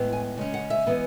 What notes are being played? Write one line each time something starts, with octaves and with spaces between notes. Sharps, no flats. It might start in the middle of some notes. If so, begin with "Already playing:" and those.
Already playing: A2 G#3 B3
G#5
C#3 G#3 C#4
F#5
E5
E3 G#3 B3